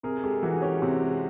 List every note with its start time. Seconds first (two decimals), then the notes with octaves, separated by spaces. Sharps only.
0.03 C3 G#4 A#4
0.23 G#3 G4 A4
0.43 E3 F#4
0.57 G#4
0.62 C#4 G4
0.81 C3 F#4 G#4
1.02 G#3